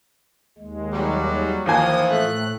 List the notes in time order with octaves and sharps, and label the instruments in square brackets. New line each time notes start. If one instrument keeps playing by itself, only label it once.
[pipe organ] D#2 G#3
[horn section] F#3 G3
[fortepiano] D#2 A#3 G#5 [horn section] E3 F3 [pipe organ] D#6
[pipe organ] A2 F#6 [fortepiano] A3